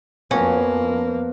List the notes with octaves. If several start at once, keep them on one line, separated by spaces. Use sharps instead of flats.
F2 F3 A#3 B3 C#4 F#4